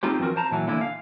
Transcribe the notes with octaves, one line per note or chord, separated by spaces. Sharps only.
C4 D#4 F4 G4 C5
E3 F3 C4 F#4 A#4
C5 A5 A#5
A#2 E3 F#3
D3 E3 A#3 D4 E4
F5